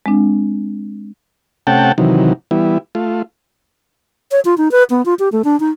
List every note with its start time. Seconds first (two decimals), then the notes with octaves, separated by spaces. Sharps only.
0.06 G#3 C4 D4
1.67 C3 A3 C#4 F#5 G5 A5
1.98 C3 D#3 E3 F#3
2.51 E3 G3 B3 E4
2.95 A3 F4
4.32 C#5
4.45 F4
4.58 D#4
4.71 B4
4.90 B3
5.06 F4
5.19 G4
5.32 A3
5.44 D4
5.60 D#4